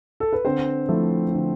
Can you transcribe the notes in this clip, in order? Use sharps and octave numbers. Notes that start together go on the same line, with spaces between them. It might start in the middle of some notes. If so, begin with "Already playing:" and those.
A4
B4
D3 C4 C5
F3 A3 E4
D3